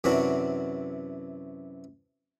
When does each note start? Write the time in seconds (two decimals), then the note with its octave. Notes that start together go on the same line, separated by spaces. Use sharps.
0.04 F#2 C3 E3 F#3 D4 F#4